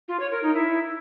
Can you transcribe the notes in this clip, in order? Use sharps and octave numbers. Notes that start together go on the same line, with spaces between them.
F4
C#5
A#4
D#4
E4